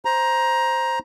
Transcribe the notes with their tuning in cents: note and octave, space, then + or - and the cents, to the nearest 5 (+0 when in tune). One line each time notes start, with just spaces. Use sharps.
C5 +0 A#5 +15